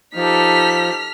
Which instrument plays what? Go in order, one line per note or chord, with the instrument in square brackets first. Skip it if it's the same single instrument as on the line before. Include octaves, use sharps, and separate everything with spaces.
[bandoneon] F3 [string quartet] D#4 G4 A4 [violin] F6 B6